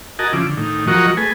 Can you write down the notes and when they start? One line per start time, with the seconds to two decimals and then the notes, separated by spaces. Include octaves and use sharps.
0.19 F#4 A#4 D#5 G#5 A5
0.33 C#3 F3 E4 D6
0.46 D3
0.57 A2 D#3
0.88 F3 F#3 F#4 A#4 D#5 C#6
1.17 A3 G#4 B4 G#5